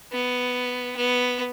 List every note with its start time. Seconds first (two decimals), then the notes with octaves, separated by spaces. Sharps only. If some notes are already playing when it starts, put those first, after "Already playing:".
0.12 B3
0.96 B3